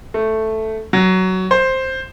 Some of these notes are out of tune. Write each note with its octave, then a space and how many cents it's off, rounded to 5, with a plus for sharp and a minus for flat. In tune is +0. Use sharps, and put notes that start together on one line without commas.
A3 +0
F#3 +15
C5 +5